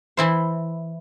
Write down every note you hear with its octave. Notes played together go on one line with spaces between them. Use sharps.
E3 E4 C5